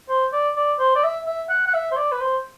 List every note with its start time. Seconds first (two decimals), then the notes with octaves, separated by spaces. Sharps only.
0.09 C5
0.33 D5
0.56 D5
0.79 C5
0.95 D5
1.03 E5
1.26 E5
1.49 F#5
1.67 F#5
1.74 E5
1.91 C5
1.97 D5
2.12 B4
2.20 C5